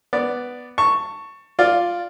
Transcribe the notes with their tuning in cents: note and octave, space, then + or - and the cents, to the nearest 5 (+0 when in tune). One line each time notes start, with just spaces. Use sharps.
B3 +0 D5 +0
A5 +25 C#6 +0
F4 +0 D5 +0